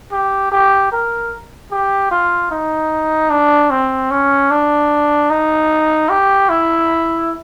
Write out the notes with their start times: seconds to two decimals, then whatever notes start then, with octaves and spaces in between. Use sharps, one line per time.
0.12 G4
0.52 G4
0.92 A#4
1.71 G4
2.11 F4
2.51 D#4
3.30 D4
3.71 C4
4.11 C#4
4.51 D4
5.30 D#4
6.09 G4
6.49 E4